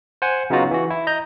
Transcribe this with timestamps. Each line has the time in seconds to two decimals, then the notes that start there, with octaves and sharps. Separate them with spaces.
0.22 C5 F#5 G#5
0.50 C#3 F#3 B3 D#4 F4 F#4
0.71 E3 F#4
0.90 E4
1.07 D#5 A#5 G6